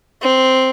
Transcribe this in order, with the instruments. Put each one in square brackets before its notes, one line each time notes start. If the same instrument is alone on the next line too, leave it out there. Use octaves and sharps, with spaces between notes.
[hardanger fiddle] C4